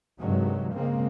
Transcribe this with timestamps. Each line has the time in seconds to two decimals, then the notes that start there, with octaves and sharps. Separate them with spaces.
0.20 G2 C3 D#3 F#3 G#3
0.74 C#3 G#3 A#3 C4